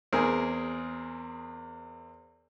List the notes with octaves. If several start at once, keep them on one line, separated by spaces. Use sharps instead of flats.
E2 C4 G#4 A#4